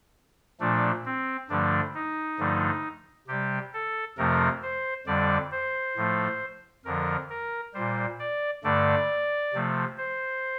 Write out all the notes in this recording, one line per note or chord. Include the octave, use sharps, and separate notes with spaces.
A#2 F3 A3 D4
C4
G2 D3 F3 A3 D4
D#4
G2 D3 F3 A3
C3 G3 G4
A4
F2 C3 F3 A3 A#4
C5
F2 D3 G3 D5
C5
A2 F3 A3
F2 D3 F3 A#4
A#4
A#2 G3 C5
D5
G2 D3 A3 D5
C3 F3 A3
C5